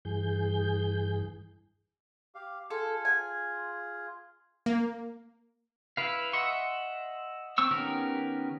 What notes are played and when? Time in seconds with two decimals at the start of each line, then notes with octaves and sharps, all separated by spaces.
0.05 G2 E3 G#4 G6
2.35 G4 F5
2.70 F4 G#4 A4
3.05 G#5
4.66 A#3
5.97 E4 B4 F5
6.33 D#5 E5 F#5 C6 C#6
7.58 C4 C#6 E6
7.71 D#3 B3 C#4 G4 A#4